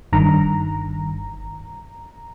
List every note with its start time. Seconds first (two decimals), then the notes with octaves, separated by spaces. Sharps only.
0.13 G1 G2 D#3 A#5